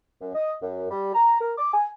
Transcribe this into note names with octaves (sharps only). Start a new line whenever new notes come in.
F#2
D#5
F#2
G3
A#5
A#4
D6
G#5